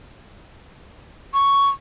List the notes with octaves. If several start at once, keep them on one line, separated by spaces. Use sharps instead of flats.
C#6